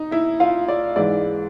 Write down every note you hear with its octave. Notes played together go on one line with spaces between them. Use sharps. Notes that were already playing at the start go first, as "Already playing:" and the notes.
Already playing: D#4
E4 E5
F4 F5
D5
G#2 E3 G#3 D5